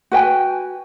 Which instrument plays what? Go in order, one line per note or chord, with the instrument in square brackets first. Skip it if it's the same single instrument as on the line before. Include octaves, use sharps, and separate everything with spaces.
[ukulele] F#4 B4 G5 G#5